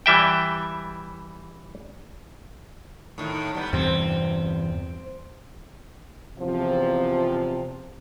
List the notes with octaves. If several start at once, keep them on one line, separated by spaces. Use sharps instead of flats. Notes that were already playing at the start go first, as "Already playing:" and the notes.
E3 G3 E5 G5
A2 D#3
G3 B3
E2 G2 C3 C4
E2 C3 F3